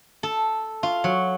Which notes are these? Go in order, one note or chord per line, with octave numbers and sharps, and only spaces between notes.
A4
F4
F#3